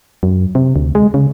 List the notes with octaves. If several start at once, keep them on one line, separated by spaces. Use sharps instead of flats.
F#2
C3
D2
G#3
C#3